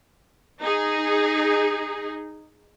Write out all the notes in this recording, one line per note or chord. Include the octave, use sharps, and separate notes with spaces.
D#4 G#4